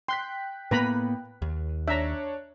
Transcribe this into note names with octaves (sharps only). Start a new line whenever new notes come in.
G5 C6 F#6 B6
A2 A#3 B3 B4 A#5 B5
D#2
D4 C#5 E5 A#5